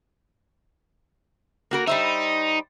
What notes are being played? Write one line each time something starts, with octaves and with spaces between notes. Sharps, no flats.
A#3 F#4 A#4
G3 D#4 C5 E5